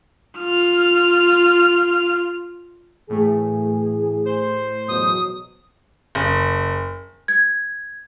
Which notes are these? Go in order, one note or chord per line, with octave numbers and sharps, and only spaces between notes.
F4 F6
A2 E3 A3 G#4
C5
E2 B2 F#3 D#6
F#1
G#6